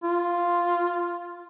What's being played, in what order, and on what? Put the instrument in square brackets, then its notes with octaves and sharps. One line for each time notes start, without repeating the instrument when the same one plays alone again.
[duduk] F4